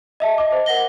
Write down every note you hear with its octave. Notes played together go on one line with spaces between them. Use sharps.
D#5 E5 A5
D#5 D6
C5
A#4 F#5 A#6 G7